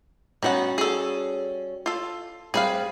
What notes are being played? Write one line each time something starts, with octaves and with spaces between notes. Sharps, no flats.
D#3 G3 B3 C#4 F#4 F#5
G#4 A4
F4 A4
G3 C4 G#4 B4 F5